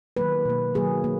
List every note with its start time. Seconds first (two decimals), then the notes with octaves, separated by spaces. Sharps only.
0.17 D#3 F#3 A#3 B4
0.45 B2 A#3
0.74 D#3 F#3 A#3 G#4
1.04 A#3